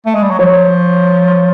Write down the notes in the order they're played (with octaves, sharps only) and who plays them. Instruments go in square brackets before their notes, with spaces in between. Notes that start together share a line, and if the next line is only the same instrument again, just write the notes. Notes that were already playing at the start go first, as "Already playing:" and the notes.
[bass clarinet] A3
G#3
G3
F#3
[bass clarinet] F3 [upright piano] C#5